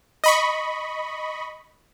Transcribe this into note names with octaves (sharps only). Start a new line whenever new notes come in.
D#5 B5 C#6